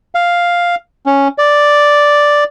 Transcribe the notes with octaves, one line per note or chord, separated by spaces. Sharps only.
F5
C#4
D5